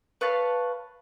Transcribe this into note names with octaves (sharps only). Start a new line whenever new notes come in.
B4 C#5 F5 A5